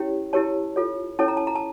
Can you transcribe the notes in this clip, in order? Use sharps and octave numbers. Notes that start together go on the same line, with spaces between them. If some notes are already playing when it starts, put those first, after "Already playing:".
Already playing: C#4 E4 G4 C#5
E4 G4 A#4 C#5 A5
F4 A4 C#5
C#4 E4 A4 C#5 A5
A#5
A5
A#5
A5